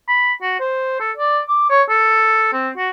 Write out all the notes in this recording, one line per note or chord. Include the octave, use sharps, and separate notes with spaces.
B5
F#4
C5
A4
D5
D6
C#5
A4
C4
F#4